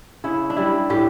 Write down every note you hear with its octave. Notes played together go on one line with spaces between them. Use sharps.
C#3 E4
D4
G3 E4
A2 G4